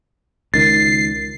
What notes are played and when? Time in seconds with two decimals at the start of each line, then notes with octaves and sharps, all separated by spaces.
0.54 C#2 D#3 A6 C7